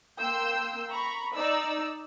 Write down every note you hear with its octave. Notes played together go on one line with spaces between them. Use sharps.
A#3 G5 C6 E6 G6
A#5 B5 C#6
D#4 D5 E6